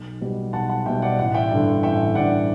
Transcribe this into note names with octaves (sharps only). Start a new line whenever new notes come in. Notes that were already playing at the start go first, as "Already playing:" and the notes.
Already playing: B1
B2 G3
B1 F#5 A5
F#5 A5
B2 G3 E5 G5
D5 F#5
A1 D5 F#5
E5 G5
G2 D3
A1 E5 G5
G2 D3 D5 F#5